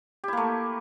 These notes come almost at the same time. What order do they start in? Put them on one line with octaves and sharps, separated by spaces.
G4 E4 A#3 A3